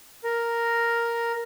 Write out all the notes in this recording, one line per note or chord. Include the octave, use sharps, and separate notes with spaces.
A#4